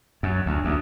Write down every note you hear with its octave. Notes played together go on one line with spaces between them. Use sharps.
F#2
D2
D2